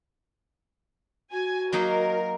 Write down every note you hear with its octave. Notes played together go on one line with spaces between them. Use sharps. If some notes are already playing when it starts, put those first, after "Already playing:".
F#4 G#5
F#3 A#3 D#4 A#4